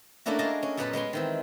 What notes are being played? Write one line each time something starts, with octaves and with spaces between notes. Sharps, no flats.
A3 A#3 C#4 D4 E4 F#4
D4 G#4 A#4 D#5 A5
C#4
F#2 A#2 B3 F#5 A5 B5
G#3 B3 G#5 C6
D#3 E3 C4